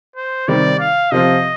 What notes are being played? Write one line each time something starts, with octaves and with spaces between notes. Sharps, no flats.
C5
C3 D#3 G3 C4 D5
F5
C3 F3 C4 F4 D#5